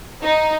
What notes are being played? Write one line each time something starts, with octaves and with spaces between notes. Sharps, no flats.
D#4